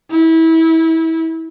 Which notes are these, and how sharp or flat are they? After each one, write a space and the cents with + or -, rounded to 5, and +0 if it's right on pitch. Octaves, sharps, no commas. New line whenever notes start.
E4 -25